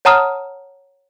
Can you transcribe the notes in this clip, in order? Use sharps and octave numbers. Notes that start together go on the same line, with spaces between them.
C#5 F#5 A5 A#5 D#6 F6